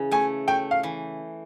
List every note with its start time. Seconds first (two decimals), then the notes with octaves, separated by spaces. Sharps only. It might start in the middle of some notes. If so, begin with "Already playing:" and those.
Already playing: C#3 E3
0.11 A3 G#5
0.48 A3 G5
0.71 F5
0.83 E3